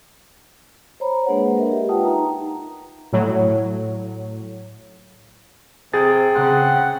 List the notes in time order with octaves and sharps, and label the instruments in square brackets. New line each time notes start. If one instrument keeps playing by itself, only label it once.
[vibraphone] C5 C#5 A#5 B5
G#3 A#3 D4 G#4 B4 F#5
A#4 D#5 E5
G4
F4 B4 F#5 G5 A5 D#6
D#4 A#5
[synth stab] A2 F#3
[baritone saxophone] C3 [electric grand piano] G#4 A6
[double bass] C#3 [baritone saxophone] C4 [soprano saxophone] F#5